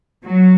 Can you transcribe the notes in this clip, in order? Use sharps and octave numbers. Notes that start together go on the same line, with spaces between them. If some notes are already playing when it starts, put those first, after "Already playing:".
F#3